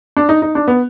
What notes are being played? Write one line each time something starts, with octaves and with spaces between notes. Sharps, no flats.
D4
D#4
D#4
D4
B3